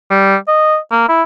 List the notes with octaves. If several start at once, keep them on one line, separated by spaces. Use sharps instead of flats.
G3
D#5
A#3
E4